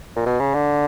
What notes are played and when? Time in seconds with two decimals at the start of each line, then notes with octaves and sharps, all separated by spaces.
0.16 A#2
0.26 B2
0.40 C#3
0.54 D3